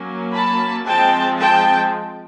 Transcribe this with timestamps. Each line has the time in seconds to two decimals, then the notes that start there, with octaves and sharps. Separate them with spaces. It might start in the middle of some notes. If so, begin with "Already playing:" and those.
Already playing: F#3 A#3 C#4
0.34 A5 B5
0.87 F3 G#3 C4 G5 A5
1.38 G5 A5